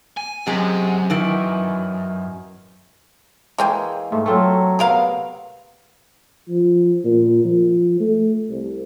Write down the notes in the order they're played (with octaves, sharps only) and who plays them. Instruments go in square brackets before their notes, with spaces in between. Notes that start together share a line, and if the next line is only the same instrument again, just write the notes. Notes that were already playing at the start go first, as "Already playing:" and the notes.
[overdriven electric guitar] G#5
[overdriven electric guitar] F#2 [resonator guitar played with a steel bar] C3 G#3
[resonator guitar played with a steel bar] D#3 E3 E4
[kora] E3 G#3 C#4 [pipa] A#3 G5 G#5
[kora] G#2 [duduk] A3
[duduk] F#3 [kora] A3 C4 F4
[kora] C3 B3 [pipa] G#4 A#4 F5
[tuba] F3
A#2
F3
A3
C2